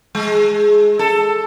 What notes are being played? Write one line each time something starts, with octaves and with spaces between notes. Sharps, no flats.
G#3
A4